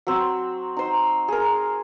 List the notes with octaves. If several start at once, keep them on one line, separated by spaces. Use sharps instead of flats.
F#3 C4
D#4 C5
G#4 A#4